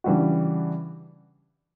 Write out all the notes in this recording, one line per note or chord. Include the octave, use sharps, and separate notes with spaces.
C#3 E3 G3 D4 F#4